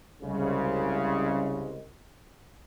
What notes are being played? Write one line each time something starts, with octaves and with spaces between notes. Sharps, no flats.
C2 C#3 G#3